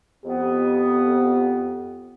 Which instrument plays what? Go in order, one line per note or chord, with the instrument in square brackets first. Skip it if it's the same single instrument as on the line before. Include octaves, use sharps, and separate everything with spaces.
[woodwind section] F2 B3 [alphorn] G4